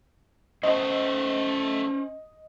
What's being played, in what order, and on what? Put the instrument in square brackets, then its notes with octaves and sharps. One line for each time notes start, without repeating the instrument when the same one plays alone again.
[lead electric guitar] F#3 A3 [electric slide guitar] C#4 C5 [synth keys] D#5